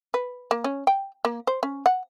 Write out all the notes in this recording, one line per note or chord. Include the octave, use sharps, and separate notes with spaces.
B4
A#3
C#4
G5
A#3
C5
C#4
F#5